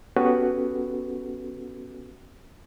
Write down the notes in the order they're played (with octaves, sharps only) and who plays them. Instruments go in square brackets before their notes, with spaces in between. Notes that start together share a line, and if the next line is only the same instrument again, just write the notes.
[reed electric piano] B3 C#4 F#4 G4 A4 B4